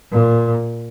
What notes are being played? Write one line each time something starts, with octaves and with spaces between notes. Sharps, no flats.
A#2